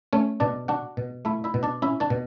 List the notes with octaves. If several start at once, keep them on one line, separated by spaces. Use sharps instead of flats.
A3 C#4 C#5
B2 D4 D5
D4 F#4 F#5
B2
A3 E4 E5
E4 E5
B2
D4 D5
C#4 E4 E5
D4 D5
B2